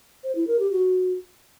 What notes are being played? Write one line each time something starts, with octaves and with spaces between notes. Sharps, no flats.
C5
E4
A#4
G4
F#4